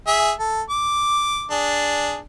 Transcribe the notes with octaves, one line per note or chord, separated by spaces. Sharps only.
G#4 E5
A4
D6
D4 G#4